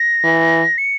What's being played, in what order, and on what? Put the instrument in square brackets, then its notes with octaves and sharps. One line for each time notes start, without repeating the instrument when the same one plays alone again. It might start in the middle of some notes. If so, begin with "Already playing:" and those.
Already playing: [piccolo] A#6
[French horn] E3
[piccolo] C#7